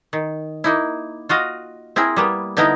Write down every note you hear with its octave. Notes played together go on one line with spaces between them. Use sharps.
D#3
A#3 D#4 E4
F4 F#4 D#5 F5
C4 E4 G#4 A#4
G3 A#3 B3
D3 B3 D#4 E4 A#4 A#5